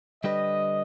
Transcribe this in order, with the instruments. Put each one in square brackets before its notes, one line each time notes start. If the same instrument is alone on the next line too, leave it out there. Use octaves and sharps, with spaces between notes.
[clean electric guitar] D3 G3 D4 G4 B4 [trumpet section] D#5